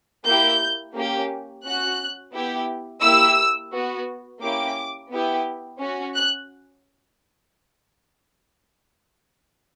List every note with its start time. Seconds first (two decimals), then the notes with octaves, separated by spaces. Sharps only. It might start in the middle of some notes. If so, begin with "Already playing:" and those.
0.24 A#3 E4 G4 G6
0.94 A#3 C#4 G4
1.63 C#4 F#4 F#6
2.33 B3 E4 G4
3.02 A#3 E4 G4 E6
3.71 B3 F#4
4.41 A#3 C#4 E4 G4 D6
5.10 B3 E4 G4
5.80 C#4 F#4
6.14 F#6